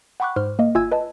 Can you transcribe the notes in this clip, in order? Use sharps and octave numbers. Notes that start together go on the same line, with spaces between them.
F#5 G5 B5 C#6 D6 F#6
G#2 C5 C6 F6
A#3 D#5
G1 F4 E5 G#5 E6 G#6
B4 D#5 A5